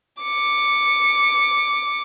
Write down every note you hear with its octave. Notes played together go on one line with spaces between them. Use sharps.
D6 C#7